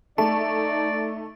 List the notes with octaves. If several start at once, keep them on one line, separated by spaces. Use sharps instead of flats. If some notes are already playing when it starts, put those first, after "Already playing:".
A3 D#4 D5 A5